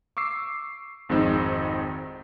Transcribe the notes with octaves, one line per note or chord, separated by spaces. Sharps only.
C#6 D6 E6 C7
G#1 F2 G#3 C4 D#4 E6